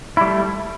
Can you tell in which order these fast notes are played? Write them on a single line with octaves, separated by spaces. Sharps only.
E4 G3 A3